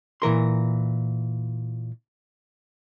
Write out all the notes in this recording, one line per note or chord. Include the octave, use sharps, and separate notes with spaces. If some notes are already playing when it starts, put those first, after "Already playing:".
A#2 E3 A#4 C6